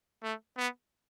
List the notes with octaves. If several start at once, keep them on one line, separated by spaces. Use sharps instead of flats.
A3
B3